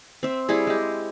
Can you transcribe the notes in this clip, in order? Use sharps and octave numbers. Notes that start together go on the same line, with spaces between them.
C4 E5
G3 E4 G#4
G#3 G4